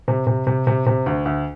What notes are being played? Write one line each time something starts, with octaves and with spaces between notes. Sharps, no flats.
C3
C3
C3
C3
C3
D2
D2